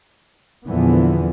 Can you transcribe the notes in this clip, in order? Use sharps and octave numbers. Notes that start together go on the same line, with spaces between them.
E2 A#2 D3 E3 F3 B3